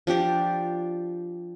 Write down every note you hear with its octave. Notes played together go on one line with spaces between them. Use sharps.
F3 D4 G4 D5